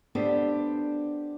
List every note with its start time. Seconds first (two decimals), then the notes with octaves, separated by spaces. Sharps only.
0.15 B3 D4 G4 A4 C5